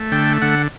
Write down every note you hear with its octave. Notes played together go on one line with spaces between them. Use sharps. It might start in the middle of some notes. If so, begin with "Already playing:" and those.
Already playing: A3
D3 G5
D3 F#5